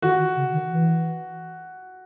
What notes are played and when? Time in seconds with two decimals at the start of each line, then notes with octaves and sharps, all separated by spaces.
0.02 D#3 F#4
0.19 D#3
0.36 C#3
0.52 D#3
0.69 E3